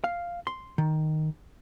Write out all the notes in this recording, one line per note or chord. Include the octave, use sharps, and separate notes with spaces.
F5
C6
D#3